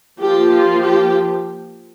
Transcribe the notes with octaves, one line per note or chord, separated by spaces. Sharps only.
F3 A#3 F4 G4
F4
G4